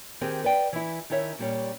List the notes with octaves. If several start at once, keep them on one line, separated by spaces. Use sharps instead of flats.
D#3 C4 G4 G#4
B4 D5 G5
E3 E4
D#3 C#4 E4 C#5 E5
A#2 G3 C#4